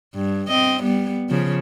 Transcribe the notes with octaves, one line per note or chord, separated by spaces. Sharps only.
G2
C4 D#5
G3 B3
C#3 F3